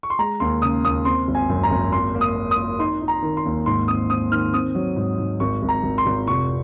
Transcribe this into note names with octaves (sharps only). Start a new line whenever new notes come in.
C#6
C6
G#3 A#5
D#2 C6
C#3 D#6
D#2 D#6
C4 C6
G#1
G#5
F#2
A#5
G#1
A#3 C6
A#3
D#6
A#3
D#6
A#3
D#4 C6
D#4
A#5
D#3
C6
D#2
G#2 C6
C4 D#6
C4 D#6
D#3 F6
C4 D#6
F#3
G#2
G#2
G#1 C#6
G#1
A#5
G#1
C6
G#1
F1 C#6